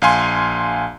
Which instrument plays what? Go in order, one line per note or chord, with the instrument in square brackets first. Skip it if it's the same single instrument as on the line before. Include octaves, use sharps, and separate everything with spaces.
[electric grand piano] A#1 F5 G#5 C6